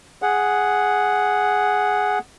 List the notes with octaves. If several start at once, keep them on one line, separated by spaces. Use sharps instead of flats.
G#4 F#5